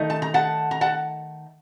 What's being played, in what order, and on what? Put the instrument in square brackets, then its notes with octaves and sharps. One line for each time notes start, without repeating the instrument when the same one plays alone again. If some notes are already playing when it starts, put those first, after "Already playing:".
Already playing: [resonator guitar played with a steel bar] D#3 A3 D#4
A5
A#5
F#5 A5
A#5
F#5 A5